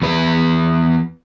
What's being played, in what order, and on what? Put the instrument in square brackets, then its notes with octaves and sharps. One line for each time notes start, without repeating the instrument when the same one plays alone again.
[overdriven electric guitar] E2 B4